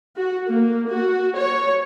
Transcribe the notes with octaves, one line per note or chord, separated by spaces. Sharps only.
F#4
A#3
F#4
C#5